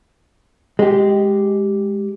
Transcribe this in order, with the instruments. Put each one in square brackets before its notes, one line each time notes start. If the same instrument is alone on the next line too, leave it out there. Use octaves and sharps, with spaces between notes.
[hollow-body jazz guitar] G#3 G4